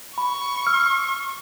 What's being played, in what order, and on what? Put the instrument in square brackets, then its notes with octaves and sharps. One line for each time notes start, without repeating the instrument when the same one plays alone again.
[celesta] B5 [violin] C#6
[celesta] E6 F6